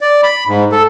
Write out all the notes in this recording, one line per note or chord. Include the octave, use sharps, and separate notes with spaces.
D5
B5
G#2
A4